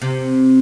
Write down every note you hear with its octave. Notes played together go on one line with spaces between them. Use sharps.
C3